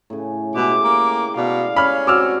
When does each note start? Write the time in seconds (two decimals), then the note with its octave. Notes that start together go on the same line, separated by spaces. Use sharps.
0.10 A2 C#3
0.55 B2 G#3 E4 G4 D6
0.84 A#3
1.37 B2 D5 F5
1.77 C#4 B5 F6
2.07 C4 F#4 D6 E6 F6